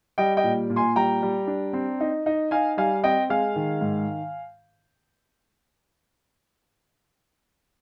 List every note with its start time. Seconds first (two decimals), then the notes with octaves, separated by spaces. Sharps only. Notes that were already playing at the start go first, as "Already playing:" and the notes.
0.18 G3 D#5 G5
0.37 D#5 G5
0.44 A#2
0.70 A#2
0.76 G#5 C6
0.95 G3 G5 A#5
1.22 G3
1.47 D4
1.73 C4
2.00 D#4
2.26 D#4
2.51 D#4 F5 G#5
2.77 G3 F5 G#5
3.03 C4 D#5 G5
3.29 G#3 F5 G#5
3.56 D#3
3.81 G#2